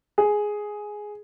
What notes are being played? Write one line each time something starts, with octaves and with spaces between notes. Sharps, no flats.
G#4